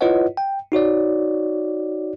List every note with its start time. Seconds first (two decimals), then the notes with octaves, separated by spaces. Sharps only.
0.01 E4 F4 B4 C#5 D#5 F#5
0.37 G5
0.72 D#4 F#4 C#5 D5